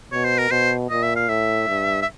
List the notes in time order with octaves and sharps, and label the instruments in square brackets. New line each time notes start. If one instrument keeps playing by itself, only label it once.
[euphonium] B2 [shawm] C#5
[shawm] C5
A#4
[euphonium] B2 [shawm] C5
[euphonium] A#2 [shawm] D#5
[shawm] E5
F5
[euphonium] A2 [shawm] E5
[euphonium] G2
[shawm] E5